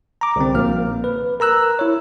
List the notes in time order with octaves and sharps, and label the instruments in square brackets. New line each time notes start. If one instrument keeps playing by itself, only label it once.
[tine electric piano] A#5 D6
C2 D3 C4
A#1 A#3 F6
B4
A#4 A#5 E6 F#6
E4 C#5